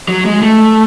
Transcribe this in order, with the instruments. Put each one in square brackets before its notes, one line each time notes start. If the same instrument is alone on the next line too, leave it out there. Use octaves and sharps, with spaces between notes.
[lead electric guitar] F#3
G#3
A3